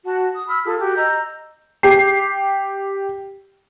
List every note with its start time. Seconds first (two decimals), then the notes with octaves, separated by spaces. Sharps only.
0.05 F#4 F#5 A5
0.33 D#6
0.48 B5 E6 F6
0.65 F4 G#4 A4
0.80 F#4 G4
0.96 D#5 A#5 E6 G6
1.83 G4 C7